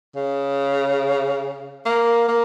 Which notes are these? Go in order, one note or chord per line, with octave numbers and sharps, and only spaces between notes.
C#3
A#3
A#3